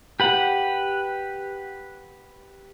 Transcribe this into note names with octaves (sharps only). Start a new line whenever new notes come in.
G4 B4 F#5